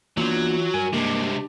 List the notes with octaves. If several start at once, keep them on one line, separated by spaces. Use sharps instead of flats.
E3 F#3 A#3 B3 D4 F4 G6
G2 A#4 G#5
C3 G#3 A#3 D4 G4